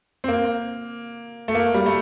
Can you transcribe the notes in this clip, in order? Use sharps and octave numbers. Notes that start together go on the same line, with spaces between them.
C4
A#3
A3
A#3
G3
A3